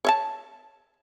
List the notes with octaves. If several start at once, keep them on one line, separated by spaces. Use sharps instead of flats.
C#5 E5 A5